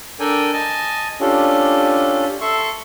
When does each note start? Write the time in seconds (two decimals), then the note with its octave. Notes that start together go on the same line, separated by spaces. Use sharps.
0.20 D4 A4 A#4 D5 G5 G#5
0.53 D#5 G#5 A5
1.20 C#4 D4 F4 G4 A4
2.41 A4 E5 C6 C#6